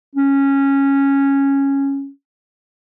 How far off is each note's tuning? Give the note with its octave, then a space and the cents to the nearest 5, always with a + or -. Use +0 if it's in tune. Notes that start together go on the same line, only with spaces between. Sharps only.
C#4 -10